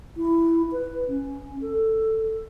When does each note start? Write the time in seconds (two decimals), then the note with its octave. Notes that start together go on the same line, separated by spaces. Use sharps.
0.17 E4
0.72 B4
1.08 C#4
1.61 A4